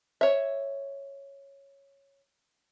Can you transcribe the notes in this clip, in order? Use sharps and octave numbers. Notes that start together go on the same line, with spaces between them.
C#5 E5